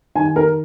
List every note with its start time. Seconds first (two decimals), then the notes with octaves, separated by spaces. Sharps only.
0.15 D#3 G#5
0.36 A#4